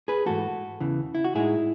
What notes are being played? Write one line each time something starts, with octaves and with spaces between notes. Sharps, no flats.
G#4 B4
G#2 E3 A3 F#4 A4
E2 C#3 E3
E4
F#4
A2 G#3 D#4 E4 G#4